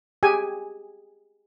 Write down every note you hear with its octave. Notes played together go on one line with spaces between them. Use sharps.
G4 G#4 G#5